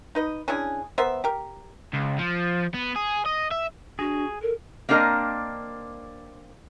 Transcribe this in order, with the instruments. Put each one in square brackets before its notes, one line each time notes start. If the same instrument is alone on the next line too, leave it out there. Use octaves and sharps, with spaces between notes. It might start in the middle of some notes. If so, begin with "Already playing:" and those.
[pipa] D#4 B4 D#5
C#4 D4 E4 G#4
B3 A#4 C5 E5
G4 A#4
[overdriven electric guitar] C#2
F3
B3
G#4
D#5
E5
[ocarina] D4 [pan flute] F#4 [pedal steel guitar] G#4
[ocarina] A4 [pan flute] A#4
[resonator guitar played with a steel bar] A#3 C4 D4 A#4 D#5